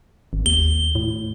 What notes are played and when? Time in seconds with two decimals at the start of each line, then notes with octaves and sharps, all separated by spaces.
0.33 G#1
0.46 D#2 G7
0.95 A2